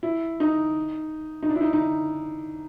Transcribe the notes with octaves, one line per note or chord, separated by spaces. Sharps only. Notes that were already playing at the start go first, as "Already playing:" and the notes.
E4
D#4
D#4
D4
E4
D#4
D#4